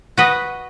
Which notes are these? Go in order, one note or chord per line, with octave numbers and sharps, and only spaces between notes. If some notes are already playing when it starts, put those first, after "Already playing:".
F#4 B4 D#5